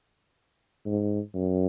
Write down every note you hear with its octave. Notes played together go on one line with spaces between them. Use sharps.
G#2
F#2